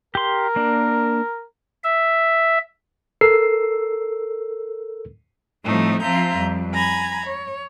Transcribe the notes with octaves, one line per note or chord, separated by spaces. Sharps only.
G4 A#4 C6
A#3 D4
E5
A4 A#4 E6 C7
A2 F3 G3 A3 C4 D#4
F3 C4 F4 E5 A#5 G6
F2 G3
G#5 A#5 B5 G#6
C#5